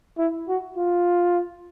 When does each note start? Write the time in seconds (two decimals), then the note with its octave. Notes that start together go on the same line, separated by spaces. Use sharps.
0.18 E4
0.48 F#4
0.78 F4